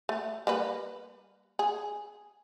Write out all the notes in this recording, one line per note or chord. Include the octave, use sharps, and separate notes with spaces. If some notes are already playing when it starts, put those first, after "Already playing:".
A3
G3 A#3 B4
G#4